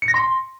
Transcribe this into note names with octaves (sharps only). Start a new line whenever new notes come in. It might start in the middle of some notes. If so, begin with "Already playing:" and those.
C#7
A#6
C6